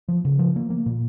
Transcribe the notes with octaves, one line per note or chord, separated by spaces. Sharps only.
F3
C#3
F3
A#3
A#3
A#2